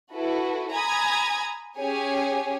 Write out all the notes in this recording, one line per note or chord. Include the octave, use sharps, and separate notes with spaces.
E4 F#4 A4 B4
G#5 A#5 B5 D#6 G#6
C#4 G4 G#4 C#5 G#5